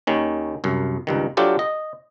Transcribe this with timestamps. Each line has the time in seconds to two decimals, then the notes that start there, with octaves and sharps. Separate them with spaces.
0.07 D#2 D#3 C#4
0.64 C2 F#2
1.07 C#2 G2 D#3
1.37 F#3 D4 F4 G4 A4
1.59 D#5